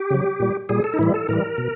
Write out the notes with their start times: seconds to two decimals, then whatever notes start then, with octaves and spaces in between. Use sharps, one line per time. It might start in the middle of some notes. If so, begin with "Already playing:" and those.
Already playing: G4
0.11 C#3 F#3
0.40 A#2 G3
0.69 A#2 G3 G#4
0.84 A4
0.94 D#4
0.99 A2 E3 G3 E4
1.14 A4
1.28 A2 E3 G3 A#4
1.58 B2